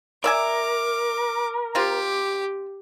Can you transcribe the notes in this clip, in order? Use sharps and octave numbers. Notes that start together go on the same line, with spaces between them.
A#4 D5 E5 G#5 D6
C4 F4 G4